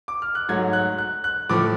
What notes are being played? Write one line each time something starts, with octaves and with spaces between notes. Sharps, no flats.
D6
F6
F#6
G#2 F#3 A3 G#6
F#6
F#6
F#6
A2 F3 A3 D6